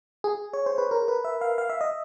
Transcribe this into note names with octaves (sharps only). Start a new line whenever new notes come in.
G#4
C#5
C5
B4
A#4
B4
E5
F5
F5
E5
D#5